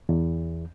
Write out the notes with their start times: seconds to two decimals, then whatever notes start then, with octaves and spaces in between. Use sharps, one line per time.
0.09 E2